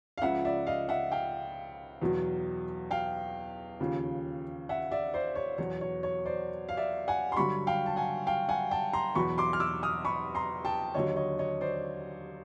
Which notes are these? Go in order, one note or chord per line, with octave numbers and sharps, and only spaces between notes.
F5
C#2 C#3 F3 E5 F#5
D5 E5
D#5 F5
E5 F#5
F5 G5
E2 B2 F#3
F5 G5
D#2 C#3 F3
E5 F#5
D5 E5
C5 D5
C#5
E2 B2 F#3 C#5
C#5
C#5
C5 D5
F5
D5 E5
F#5 G#5
C6
G2 D3 F#3 B5 C#6
F5 G5
A5
F#5 G#5
F5 G5
F#5 G#5
G5 A5
A#5 C6
E2 B2 F#3 B5 C#6
C6 D6
F6
D6 E6
D#6 F6
B5 C#6
A#5 C6
G5 A5
D#2 D3 F#3 C#5 D#5
C#5 D#5
C#5 D#5
C5 D5